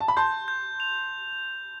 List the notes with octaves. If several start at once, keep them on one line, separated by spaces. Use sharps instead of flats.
A5
B5
A5 C6 G6
G6
F7